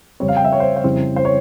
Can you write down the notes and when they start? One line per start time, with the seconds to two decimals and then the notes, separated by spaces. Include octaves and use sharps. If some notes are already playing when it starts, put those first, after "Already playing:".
0.20 F2 C#3 G3 C4 C#5
0.28 F5
0.36 G5
0.44 E5
0.52 C#5
0.60 C5
0.76 C5
0.84 F2 C#3 G3 C4 E4
1.16 C5
1.25 C#5